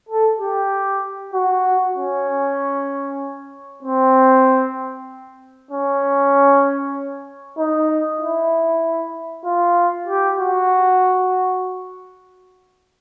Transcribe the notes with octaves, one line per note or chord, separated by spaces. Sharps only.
A4
G4
F#4
C#4
C4
C#4
D#4
E4
F4
G4
F#4